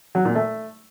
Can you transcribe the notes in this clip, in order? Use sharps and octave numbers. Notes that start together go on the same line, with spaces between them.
F#3
A#2
A3